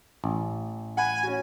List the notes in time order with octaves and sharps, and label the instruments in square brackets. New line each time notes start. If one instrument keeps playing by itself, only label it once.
[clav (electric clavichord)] A1
[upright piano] F#5 B5 [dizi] G#5
[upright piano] C#4 F#4